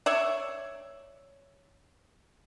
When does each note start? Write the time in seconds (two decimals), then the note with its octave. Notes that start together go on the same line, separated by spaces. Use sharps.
0.06 C#5 D5 E5